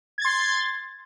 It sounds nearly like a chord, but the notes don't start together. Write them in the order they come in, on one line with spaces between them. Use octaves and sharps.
G#6 A6 C6